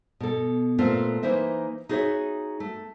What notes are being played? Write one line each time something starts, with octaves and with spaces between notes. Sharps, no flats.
B2 A4
A#2 A3 B3 C4 F4
E3 A#3 D#4 C5 E5
D#4 F#4 G#4 B4 C#5 E5
A3